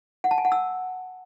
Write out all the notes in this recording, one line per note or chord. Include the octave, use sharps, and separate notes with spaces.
F#5
A5
G#5
F#5
E6